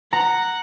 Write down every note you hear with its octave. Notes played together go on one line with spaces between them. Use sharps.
F#5 A#5